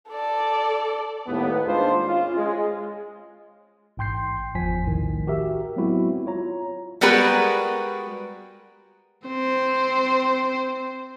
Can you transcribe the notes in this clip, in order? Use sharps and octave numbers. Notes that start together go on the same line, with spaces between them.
A4 D5
D#2 A2 G3 B3
D#2 G#3 D4 F4 C5
C#4 F4
G#3
A1 G#2 G5 C6 G6 C7
G1 E2 F3 G#5 B6
B1 A2 D#3
F#4 G4 A#4 E5
F#3 G#3 B3 C4 E4 F#4
F4 C#5 A#5
G3 G#3 B3 F#4 A#4 B4
C4 C5